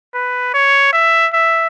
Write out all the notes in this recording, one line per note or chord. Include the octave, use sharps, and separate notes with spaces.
B4
C#5
E5
E5